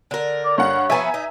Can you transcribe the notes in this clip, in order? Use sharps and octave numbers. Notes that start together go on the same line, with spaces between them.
D3 A#4
D5
G2 C#5 F5 F#5
F3 B3 E5 G#5 A#5
D#4